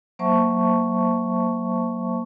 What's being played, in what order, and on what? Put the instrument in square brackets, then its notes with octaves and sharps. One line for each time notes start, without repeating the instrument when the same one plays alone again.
[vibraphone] F#3 A#3 C5 E5 A5 C#6